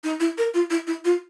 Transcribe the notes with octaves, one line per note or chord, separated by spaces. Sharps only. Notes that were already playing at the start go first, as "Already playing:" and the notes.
D#4
E4
A#4
F4
E4
E4
F4